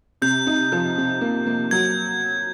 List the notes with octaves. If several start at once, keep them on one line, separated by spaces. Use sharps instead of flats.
C3 G6
D#4
F3
C3
A#3
A#3
F#3 G#6